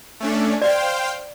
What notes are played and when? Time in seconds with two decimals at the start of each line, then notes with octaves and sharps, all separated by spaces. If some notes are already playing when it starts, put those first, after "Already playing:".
0.20 A3 C#4 D4
0.62 C5 D5 F5 G5